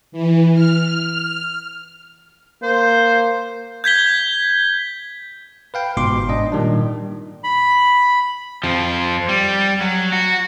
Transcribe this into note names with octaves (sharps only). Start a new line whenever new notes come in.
E3
F6
A#3 C5
G6 G#6 B6 G7
B4 F5 G5
G1 G#2 B2 C6 D6
G#2 D4 D#5
A#2 D#3 G3 D4
B5
F2 F3
G3
F#3
F#4